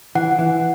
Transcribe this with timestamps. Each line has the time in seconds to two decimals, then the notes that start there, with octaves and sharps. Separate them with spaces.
0.15 E3 F#5
0.39 E3